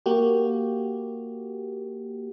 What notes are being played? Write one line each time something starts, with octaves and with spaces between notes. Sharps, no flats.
A#3 F#4 G4